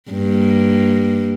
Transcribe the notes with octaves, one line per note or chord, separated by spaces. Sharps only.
G2 A#3